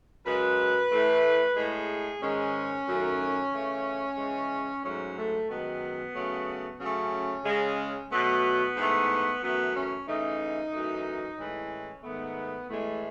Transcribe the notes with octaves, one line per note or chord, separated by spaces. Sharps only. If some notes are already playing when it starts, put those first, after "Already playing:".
F#2 C#3 G#3 B4
A2 E3 A3
A2 G#3 G#4
G#2 D#3 G#3 C#4
F#2 D#3 F#3 A3
C#3 E3 A3
C#3 E3 G#3
G#2 F#3 A3 C#4
A3
F#2 D#3 G#3 B3
C#3 F#3 A3
C#3 F#3 A3 C#4
C#3 G#3
B2 F#3 A3 B3
G#2 E3 A3
F#2 E3 A3 B3
C#4
C#3 E3 A3 D#4
F#2 E3 A3
A2 E3 G#3 C#4
G#2 D#3 A3 B3
A2 E3 G#3 A3